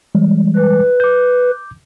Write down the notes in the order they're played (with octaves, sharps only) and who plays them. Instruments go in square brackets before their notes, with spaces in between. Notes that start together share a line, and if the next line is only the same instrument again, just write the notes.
[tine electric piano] E3 G3 G#3
[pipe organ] B4
[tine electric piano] D6 G6